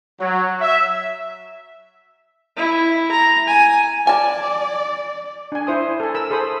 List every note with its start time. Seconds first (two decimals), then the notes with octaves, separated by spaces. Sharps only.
0.19 F#3
0.61 E5
2.56 E4
3.11 A#5
3.48 G#5
4.07 D5 G#5 A5
5.52 D4 G#5
5.67 E4 C5 D#6
6.00 A4 G#5
6.15 A#4 B5 E6
6.30 G#4 A4 C5 B5 D#6